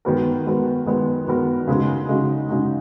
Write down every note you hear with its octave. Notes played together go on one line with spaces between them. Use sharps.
D#3 G#3 B3 F#4 A#4
D#3 G#3 B3 F#4 A#4
D#3 G#3 B3 F#4 A#4
D#3 G#3 B3 F#4 A#4
C#3 G#3 D#4 F#4
C#3 G#3 D#4 F#4
C#3 G#3 D#4 F#4